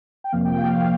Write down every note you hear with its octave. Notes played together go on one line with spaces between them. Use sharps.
G5
F2 C3 F3 A#3 F5
G5
F5
F5